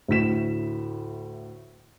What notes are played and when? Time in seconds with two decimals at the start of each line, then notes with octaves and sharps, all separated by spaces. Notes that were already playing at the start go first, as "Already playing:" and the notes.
0.08 D2 A2 B6 E7